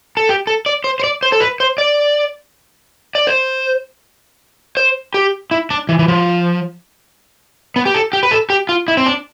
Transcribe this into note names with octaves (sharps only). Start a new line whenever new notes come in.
A4
G4
A4
D5
C5
C5
D5
C5
A4
B4
C5
D5
D5
C5
C5
G4
E4
D4
E3
E3
F3
B3
G4
A4
G4
B4
A4
G4
F4
E4
C4
D4